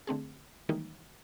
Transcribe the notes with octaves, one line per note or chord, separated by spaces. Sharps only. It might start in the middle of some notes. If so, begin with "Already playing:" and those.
D3 A3 C4 G#4
D#3 E3 G3 G#3 A#3 D#4